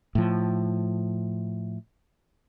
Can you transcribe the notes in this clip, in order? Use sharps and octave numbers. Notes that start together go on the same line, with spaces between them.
A2 F3